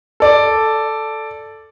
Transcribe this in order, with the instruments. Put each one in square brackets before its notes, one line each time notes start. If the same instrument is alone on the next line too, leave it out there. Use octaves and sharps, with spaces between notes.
[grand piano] A4 D5